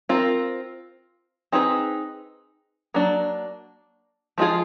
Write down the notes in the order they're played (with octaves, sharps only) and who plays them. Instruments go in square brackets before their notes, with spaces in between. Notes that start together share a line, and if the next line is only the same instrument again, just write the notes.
[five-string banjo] C4 F4 A#4
C4 D#4 G#4 B4
F#3 A#3 D4
F3 G#3 C4 F4 G#4